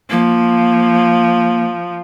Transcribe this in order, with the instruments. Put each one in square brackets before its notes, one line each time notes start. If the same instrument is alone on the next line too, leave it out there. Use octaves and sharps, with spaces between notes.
[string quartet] F3 [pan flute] A#3